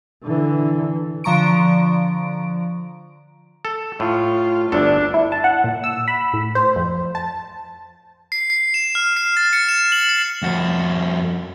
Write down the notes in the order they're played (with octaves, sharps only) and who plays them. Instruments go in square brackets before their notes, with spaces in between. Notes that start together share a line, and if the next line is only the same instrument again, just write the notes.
[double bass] D3 E3
[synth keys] D3 F3 A#5 C#6 D7
[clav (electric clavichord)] A4
[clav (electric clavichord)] A2 [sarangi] F4
[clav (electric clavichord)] G1 D2 A4 [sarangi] D4
[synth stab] E4
A5
F#5
A#2
E6
B5
A2
C5
F2
A5
[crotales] C7
C7
E7
F6
C7
A6
C#7
E7
F#7
C7
[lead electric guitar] F2 F#4